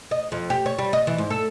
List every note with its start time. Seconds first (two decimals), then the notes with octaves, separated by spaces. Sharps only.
0.11 D#5
0.32 F2
0.50 G4
0.66 C#5
0.79 G3
0.93 D#5
1.07 E3
1.18 G#2
1.30 A4